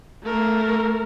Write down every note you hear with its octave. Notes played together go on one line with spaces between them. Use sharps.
A3 A#4